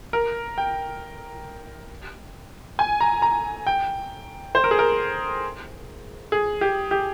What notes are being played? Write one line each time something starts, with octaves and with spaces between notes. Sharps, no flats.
A#4
G5
G#5
A#5
A#5
G5
C5
A#4
G#4
A#4
G#4
G4
G4